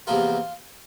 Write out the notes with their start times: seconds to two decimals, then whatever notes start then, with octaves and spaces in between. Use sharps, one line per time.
0.07 E2 C3 F3 A#3 F4